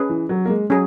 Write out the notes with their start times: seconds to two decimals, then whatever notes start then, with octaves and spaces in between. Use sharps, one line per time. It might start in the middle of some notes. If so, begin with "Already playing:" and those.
Already playing: C#4 G#4 B4
0.09 E3
0.29 F#3
0.45 A#3
0.49 G#3
0.70 F#3 C#4 G#4